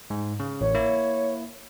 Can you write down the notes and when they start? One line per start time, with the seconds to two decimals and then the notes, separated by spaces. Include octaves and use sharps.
0.10 G#2
0.40 C#3
0.61 A1 C#5
0.75 A#3 E4